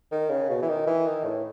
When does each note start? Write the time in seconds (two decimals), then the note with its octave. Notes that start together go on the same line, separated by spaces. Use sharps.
0.12 D#3
0.30 C#3
0.50 B2
0.62 E3
0.69 D#3
0.87 E3
1.06 D#3
1.25 A2